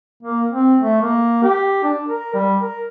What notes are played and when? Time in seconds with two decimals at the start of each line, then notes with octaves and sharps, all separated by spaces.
0.23 A#3
0.52 C4
0.81 A3
1.02 A#3
1.43 G4
1.84 D4
2.07 A#4
2.34 G3
2.61 A#4